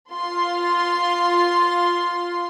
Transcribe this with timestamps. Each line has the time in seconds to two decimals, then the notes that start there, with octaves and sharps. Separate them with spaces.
0.14 F4 C6